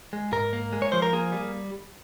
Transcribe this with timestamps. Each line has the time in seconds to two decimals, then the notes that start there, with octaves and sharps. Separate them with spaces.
0.13 G#3
0.32 G#2 A#4
0.53 A#3
0.73 G#3
0.82 C#5
0.92 F3 C5
1.02 A#4
1.13 A#3 G#4
1.32 G3